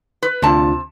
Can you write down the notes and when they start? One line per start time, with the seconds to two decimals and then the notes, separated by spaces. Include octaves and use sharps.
0.22 B4
0.42 D2 C3 D4 F4 A5